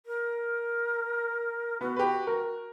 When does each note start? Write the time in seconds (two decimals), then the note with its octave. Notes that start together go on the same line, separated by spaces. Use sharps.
0.06 A#4
1.81 B3 F#4
1.96 G4 B4
2.27 A#4